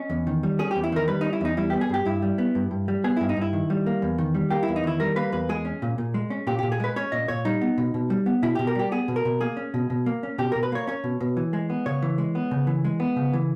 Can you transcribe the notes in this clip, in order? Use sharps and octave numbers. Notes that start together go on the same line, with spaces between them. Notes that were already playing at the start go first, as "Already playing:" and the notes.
Already playing: C#4 D#5
E2
D#3
G3
C#4 G#4
E2 G4
E4
D#3 A#4
G3 B4
C#4 D#4
E4
E2 D#4
G3 E4
B3 G4
G#4
G2 G4
G2 E4
G3
B3
G2
G2
G3
B3 G#4
G2 E4
D#4
G2 E4
D#3
G3
A#3
E2
D#3
G3
A#3 G4
E4
E2
D#4
D#3 E4
G3 A#4
A#3 B4
E2 B4
G#3 G#4
C#4
A#2
A#2
G#3
C#4
A#2 G4
A#2 G4
G#4
G#3 B4
C#4 C#5
A#2 D#5
A#2 C#5
G3 D#4
B3
B2
B2
G3
B3
B2 E4
B2 G4
A#4
G3 G4
B3 G#4
B2
A#4
B2
A#3 G#4
C#4
B2
B2
A#3
C#4
B2 G4
B2 A#4
B4
A#3 C#5
C#4 C#5
B2
B2
E3
G#3
B3
C#3 C#5
E3
G#3
B3
C#3
E3
G#3
B3
C#3
E3